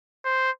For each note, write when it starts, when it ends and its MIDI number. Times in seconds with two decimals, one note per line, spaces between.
0.25 0.51 72